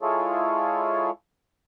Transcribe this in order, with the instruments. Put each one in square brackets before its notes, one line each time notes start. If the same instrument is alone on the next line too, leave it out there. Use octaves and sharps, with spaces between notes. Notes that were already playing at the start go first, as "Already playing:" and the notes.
[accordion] G#3 E4 F4 G#4 A4 C#5